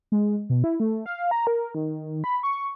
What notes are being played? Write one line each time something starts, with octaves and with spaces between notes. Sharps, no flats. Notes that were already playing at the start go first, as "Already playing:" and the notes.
G#3
B2
E4
A3
F5
A#5
A#4
D#3
B5
C#6